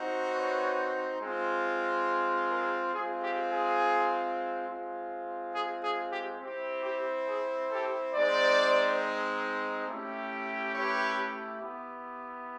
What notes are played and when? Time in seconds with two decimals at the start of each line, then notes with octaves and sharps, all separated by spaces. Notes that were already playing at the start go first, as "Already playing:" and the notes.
Already playing: C4 D#4 F#4
0.33 B4 C#5
1.21 G#3 C4 F4
2.51 G#4 A#4
2.94 G#3 C4 F4 G#4
3.22 G4
3.52 G#4
4.68 G#3 C4 F4
5.54 G#4
5.83 G#4
6.12 G4
6.41 C4 E4 G4
6.85 G4
7.28 G#4
7.71 G4 A4
8.15 G#3 C4 D#4 C5 D5
9.88 A3 C#4 E4 G4
10.75 B4 C#5
11.62 B3 E4 G4